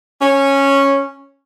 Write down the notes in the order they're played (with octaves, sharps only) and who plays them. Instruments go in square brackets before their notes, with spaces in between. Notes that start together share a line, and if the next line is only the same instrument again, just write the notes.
[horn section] C#4